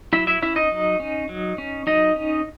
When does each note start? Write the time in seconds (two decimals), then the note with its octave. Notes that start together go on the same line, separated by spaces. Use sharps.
0.13 F#3 E4 E5
0.27 E4 E5
0.42 C#4 E4 E5
0.56 D#4 D#5
0.72 F#3
1.00 C#4
1.29 F#3
1.58 C#4
1.87 F#3 D#4 D#5
2.16 C#4